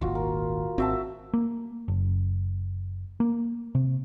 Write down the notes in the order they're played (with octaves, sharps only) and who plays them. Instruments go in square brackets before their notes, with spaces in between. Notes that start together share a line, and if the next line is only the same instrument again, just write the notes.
[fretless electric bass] D#1 G#1 D#2 [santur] F4 F#4
[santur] A#4
[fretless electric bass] G#1 C4 [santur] F#4 E5 A5
[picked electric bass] A#3
F#1
A#3
C3